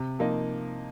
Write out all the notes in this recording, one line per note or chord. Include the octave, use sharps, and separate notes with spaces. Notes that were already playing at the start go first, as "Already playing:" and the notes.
Already playing: C3
F3 A#3 D#4